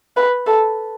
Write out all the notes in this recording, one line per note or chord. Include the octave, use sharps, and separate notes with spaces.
B4
A4